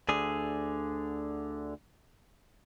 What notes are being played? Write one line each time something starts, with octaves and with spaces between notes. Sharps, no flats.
D2 D3 G#4